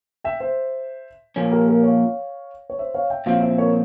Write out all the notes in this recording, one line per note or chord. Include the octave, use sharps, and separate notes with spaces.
E5 G5
C5 E5
A#2 F3 A#3 C#4
G4 A#4
G4 A#4
C#5 F5
C#5
C5 E5
C#5 F5
E5 G5
A#2 F3 C4 E4 C#5 F5
C5 E5
A#4 C#5